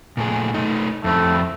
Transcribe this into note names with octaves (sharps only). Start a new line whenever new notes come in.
A#2 A3 G#4
A3 D#4
F2 A3 C4 E4